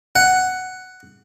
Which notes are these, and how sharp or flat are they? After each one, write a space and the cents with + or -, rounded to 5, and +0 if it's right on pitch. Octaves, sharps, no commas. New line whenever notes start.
F#5 +5